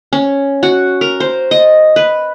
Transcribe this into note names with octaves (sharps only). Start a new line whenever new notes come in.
C#4
F#4
A#4
C5
D#5
B4